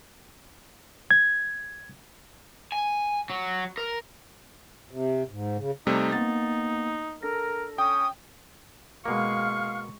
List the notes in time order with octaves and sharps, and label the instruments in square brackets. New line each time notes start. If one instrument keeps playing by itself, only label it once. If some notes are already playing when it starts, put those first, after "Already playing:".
[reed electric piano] G#6
[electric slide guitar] G#5
F#3
A#4
[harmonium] C3
G#2
C#3
[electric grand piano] C3 G3 A3 [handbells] C4 G#6 [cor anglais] D#4
[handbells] A#3 B3 [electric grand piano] A6
[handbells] D4 A4 A#6 [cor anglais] A#4
[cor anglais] C#4 [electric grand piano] G5 [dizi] D#6
[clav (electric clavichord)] B2 A#3 [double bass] G#3 [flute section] F5 F6 [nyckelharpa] C#6